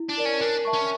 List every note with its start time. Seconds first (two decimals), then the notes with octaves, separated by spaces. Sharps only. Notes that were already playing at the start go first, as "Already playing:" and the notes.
Already playing: E4
0.09 D4
0.17 A#4 D5
0.25 C#4
0.41 D4 A#4
0.65 E5 A5 C#6
0.73 C#4